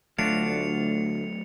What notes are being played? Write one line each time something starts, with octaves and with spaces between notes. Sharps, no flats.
D2 F#3 A3 D4 F4 F#4 C#7 F7